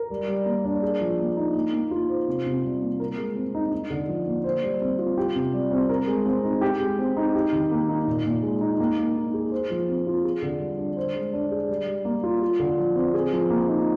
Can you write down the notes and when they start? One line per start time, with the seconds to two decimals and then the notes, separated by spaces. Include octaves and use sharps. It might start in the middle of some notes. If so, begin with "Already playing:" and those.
Already playing: A#4
0.10 G3
0.28 G3
0.46 A#3
0.65 D4
0.82 G#4
1.00 F3
1.19 A#3
1.37 D#4
1.54 A#3
1.73 A#3
1.91 F4
2.09 C5
2.28 C3
2.46 C3
2.64 G3
2.82 A#3
3.00 A#4
3.18 G#3
3.36 C4
3.55 D#4
3.72 D#4
3.90 D3
4.08 F3
4.27 A#3
4.44 C5
4.63 G3
4.81 C4
4.99 F4
5.18 G4
5.36 C3
5.53 G3
5.71 C4
5.89 A#4
6.08 G#3
6.26 C4
6.44 D#4
6.61 G4
6.80 G#3
6.99 C4
7.17 D#4
7.35 G4
7.52 D#3
7.71 A#3
7.89 D#4
8.07 A#2
8.25 A#2
8.43 G#3
8.61 D#4
8.80 A#3
8.98 A#3
9.16 D#4
9.34 G#4
9.52 C5
9.70 F3
9.88 C4
10.07 F4
10.24 G#4
10.42 D3
10.60 G3
10.78 D4
10.97 C5
11.15 G#3
11.33 D4
11.51 G#4
11.69 G3
11.87 G3
12.05 A#3
12.23 F4
12.42 F4
12.59 D3
12.78 F3
12.96 C4
13.14 G#4
13.33 F3
13.50 A#3
13.68 D#4